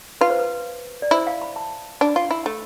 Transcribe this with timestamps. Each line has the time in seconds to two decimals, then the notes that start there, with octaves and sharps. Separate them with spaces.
0.21 F4 B4
0.30 C5
0.39 B4
1.02 D5
1.11 E4 C5
1.27 F5
1.42 B5
1.56 A5
2.01 D4 B5
2.16 F4
2.31 E4
2.46 A3